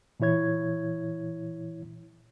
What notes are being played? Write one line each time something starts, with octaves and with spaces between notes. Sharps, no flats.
A#2 E3 E4 C#5 G#6